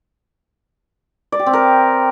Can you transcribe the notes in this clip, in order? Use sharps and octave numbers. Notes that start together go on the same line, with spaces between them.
D5
G4
C4
A#4